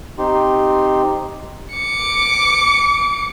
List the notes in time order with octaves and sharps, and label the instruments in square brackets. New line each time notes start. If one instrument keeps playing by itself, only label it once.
[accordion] C4 D#4 G4 C6
[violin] D6 C#7